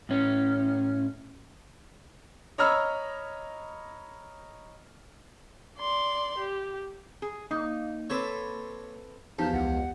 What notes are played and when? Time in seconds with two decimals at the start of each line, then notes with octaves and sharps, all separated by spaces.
0.09 A2 C#4
2.58 C#5 D#5 A#5 B5 E6 F6
5.78 D5 C6
6.38 G4
7.22 G#4
7.51 A#3 D#4
8.10 C4 A4 B4 C#5 C6 D6
9.39 E2 F3 D#4 G4 A5
9.53 C#2 F#5